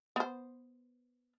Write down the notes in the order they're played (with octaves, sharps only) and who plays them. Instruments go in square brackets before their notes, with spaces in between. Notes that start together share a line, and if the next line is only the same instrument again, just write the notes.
[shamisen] B3 C5